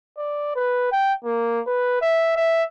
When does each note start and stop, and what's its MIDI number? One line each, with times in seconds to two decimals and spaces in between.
0.18 0.53 74
0.56 0.91 71
0.92 1.14 79
1.25 1.60 58
1.67 2.02 71
2.02 2.34 76
2.36 2.63 76